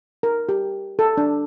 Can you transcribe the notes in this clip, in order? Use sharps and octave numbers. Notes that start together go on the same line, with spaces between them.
A#4
G4
A4
D4